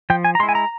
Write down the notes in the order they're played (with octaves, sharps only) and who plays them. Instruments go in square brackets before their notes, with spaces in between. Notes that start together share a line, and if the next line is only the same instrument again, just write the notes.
[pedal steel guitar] F3 G5
G#5
A#5
G#3 C6
E4
G#5
A#5